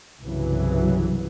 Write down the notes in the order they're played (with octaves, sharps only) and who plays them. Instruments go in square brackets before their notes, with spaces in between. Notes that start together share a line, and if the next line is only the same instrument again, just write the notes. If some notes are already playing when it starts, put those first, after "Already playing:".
[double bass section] C2 G2 C#3 E3 F#3